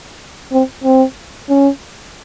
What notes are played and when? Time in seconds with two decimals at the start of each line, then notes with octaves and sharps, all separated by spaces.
0.52 C4
0.84 C4
1.49 C#4